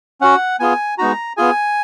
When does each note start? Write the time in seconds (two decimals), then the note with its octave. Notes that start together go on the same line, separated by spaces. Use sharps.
0.21 C#4 F#4 F#5
0.60 B3 F4 G#4 G#5
0.98 G#3 B3 D#4 F#4 A#5
1.37 B3 F4 G#4 G#5